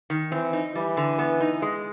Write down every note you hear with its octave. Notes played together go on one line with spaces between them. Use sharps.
D#3
E3 C4
D#4
E3 G3
D3
B3
D#4
G#3